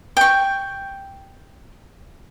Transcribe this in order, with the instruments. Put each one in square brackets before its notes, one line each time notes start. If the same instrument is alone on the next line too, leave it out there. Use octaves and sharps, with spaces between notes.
[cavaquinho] G5 C#6